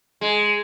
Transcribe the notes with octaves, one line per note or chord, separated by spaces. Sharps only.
G#3